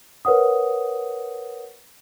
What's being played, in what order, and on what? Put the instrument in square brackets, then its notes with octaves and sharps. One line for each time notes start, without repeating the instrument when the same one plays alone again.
[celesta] A#4 B4 C#5 F#5 D#6